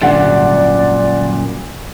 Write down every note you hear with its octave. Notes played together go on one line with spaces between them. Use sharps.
G#1 F#2 A#2 D3 G3 D5 F#5 A6